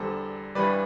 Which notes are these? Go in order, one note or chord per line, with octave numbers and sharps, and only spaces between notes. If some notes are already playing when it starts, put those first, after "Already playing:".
Already playing: E2 D3 G3 A4 C5
G2 E3 G3 B4 D5